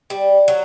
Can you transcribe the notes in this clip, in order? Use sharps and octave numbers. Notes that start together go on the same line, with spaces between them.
G3
F#3